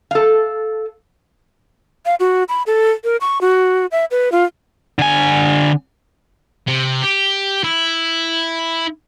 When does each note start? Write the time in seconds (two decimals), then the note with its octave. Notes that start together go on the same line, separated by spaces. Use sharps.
0.11 A4 F5
2.06 F5
2.20 F#4
2.49 B5
2.67 A4
3.04 A#4
3.21 C#6
3.41 F#4
3.92 E5
4.11 B4
4.32 F4
4.99 D3 G#5
6.67 C3
7.03 G4
7.64 E4